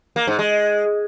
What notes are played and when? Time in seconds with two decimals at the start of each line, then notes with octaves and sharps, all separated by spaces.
0.16 A#3
0.27 G#2
0.39 G#3